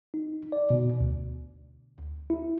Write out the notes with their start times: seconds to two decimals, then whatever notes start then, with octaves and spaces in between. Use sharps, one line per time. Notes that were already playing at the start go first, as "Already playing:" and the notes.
0.14 D#4
0.52 D5
0.70 B2
1.01 D2
2.30 E4